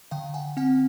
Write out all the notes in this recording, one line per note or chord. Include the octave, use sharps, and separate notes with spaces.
D3 F5 G5
F#5 G#5
C4 F#5 G#5